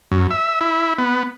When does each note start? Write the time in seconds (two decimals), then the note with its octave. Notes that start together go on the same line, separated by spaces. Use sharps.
0.12 F#2
0.31 E5
0.61 E4
0.98 B3